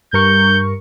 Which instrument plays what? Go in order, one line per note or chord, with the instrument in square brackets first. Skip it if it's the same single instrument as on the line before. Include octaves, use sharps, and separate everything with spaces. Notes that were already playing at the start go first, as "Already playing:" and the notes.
[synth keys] G2 A#4 C#6 [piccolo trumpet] G6